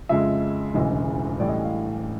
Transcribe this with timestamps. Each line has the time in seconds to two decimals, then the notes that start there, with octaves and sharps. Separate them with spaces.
0.09 F2 C#3 F3 G#3 E5
0.74 E1 D2 C#3 E3 D#5
1.40 A1 A2 E3 G3 D5
1.48 D#5
1.64 F5